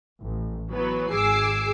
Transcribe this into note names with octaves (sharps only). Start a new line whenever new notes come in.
A1
E3 F#3 B3 B4
G#1 G#4 G#5 D6 E6 C7